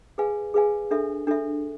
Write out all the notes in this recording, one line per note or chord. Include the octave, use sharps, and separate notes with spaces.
G#4 B4 F5 G#5
G#4 B4 F5 G#5
D4 A4 E5
D4 A4 E5